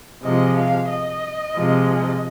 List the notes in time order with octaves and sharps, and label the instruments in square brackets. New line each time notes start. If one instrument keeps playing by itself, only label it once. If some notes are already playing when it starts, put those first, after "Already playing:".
[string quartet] C3 F3 G#3 D#5
F5
D#5
C3 F3 G#3